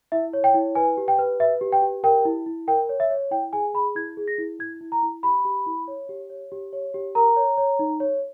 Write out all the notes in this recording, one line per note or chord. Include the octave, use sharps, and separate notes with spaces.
E4 E5
C#5
G5
E4
B4 G#5
G4
G5
B4
B4 E5
G4
G5
G4
A#4 G5
E4
E4
A#4 G5
C#5
E5
C#5
E4 G5
G#4 G#5
G#4 B5
E4 G#6
G#4
A#6
E4
E4 G#6
E4
A#5
E4
G4 B5
G4
E4
C#5
G4
C#5
G4
C#5
G4
A#4 A#5
C#5
C#5
D#4
C#5